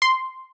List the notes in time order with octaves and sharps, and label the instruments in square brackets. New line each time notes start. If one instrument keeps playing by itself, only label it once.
[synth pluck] C6